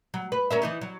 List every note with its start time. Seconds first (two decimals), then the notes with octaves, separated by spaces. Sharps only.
0.14 F#3
0.32 B4
0.50 C#4 A#4 E5
0.62 E3 D#4 E4
0.81 F#3